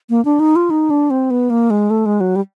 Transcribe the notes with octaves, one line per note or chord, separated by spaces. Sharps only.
A#3
D4
D#4
F4
D#4
D4
C4
B3
A#3
G#3
A3
G#3
F#3
G3